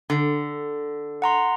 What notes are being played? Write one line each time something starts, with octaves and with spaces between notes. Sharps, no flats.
D3
F#5 A#5 C6